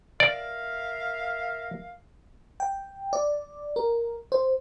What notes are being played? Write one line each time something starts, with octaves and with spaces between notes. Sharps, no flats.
A#4 D5 E5 F5
G5
D5
A#4
C5